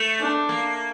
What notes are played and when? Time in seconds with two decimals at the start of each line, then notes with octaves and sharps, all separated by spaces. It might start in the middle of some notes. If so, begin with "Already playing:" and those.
Already playing: A3
0.20 D4
0.49 A#3